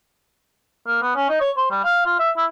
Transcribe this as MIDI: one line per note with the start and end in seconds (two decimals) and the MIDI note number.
0.87 0.98 58
1.02 1.14 59
1.16 1.28 61
1.29 1.39 63
1.41 1.51 73
1.57 1.70 72
1.71 1.80 55
1.84 2.05 77
2.06 2.16 65
2.19 2.31 76
2.37 2.45 64